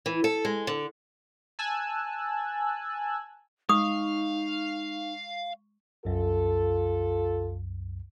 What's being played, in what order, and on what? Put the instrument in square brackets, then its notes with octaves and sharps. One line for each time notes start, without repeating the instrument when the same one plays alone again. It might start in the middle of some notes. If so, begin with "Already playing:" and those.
[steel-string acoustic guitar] E3
A4
G#3
D3
[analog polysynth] G#5 A5 E6 F#6
[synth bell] G#3 C#6 [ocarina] D#4 [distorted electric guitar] F5 [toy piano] D#6
[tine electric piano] C2 F#2 [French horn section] F4 A4